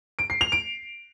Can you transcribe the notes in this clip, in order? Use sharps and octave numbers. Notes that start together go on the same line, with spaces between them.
D7
C7
F7
D7